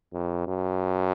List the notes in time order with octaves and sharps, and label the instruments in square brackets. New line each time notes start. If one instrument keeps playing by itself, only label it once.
[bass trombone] F2
F#2